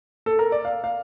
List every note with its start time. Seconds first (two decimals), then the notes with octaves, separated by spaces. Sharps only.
0.26 A4
0.39 A#4
0.52 D5
0.65 F5
0.84 F5